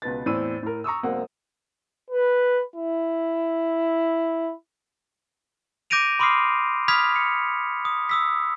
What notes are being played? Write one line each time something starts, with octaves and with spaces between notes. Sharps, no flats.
C#2 B2 B4 A6
E2 A2 C4 D5 E6 D#7
A2 A#4
A#5 C#6 D#6 E6
E1 B1 A#3 C4 F#5
B4
E4
D6 G6 A#6 D7 D#7 F7
B5 C6 D6 D#6 F6 C7
B5 D#6 F6 G#6 B6 F7
C#7
D#6
D#6 E6 B6